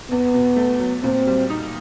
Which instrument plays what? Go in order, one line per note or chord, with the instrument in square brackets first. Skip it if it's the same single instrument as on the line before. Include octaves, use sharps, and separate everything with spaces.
[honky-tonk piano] E2 [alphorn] B3
[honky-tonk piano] B2
A3
F#3
[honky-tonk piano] A#2 [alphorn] C4
[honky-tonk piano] G3
D#4